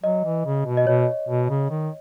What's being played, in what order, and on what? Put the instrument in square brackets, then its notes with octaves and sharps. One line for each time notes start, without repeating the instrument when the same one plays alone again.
[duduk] F#3 [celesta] D#5
[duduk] E3
C#3
B2
[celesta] D#5
[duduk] B2 [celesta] C#5
[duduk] B2
C#3
D#3